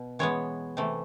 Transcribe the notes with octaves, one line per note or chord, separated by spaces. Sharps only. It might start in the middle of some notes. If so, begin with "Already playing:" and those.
Already playing: B2
E3 G#3 B3 C#5
C3 E3 A3